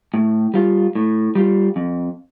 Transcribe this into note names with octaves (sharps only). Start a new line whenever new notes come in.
A2
G3 F4
A2
G3 F4
F2